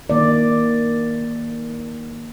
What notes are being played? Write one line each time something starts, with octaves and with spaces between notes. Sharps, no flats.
D#3 A#3 D#4 D5